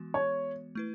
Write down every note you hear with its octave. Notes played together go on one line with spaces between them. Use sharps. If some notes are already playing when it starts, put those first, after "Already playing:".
Already playing: E3 G#3 B3 F#4
C#5
A3 E4 B4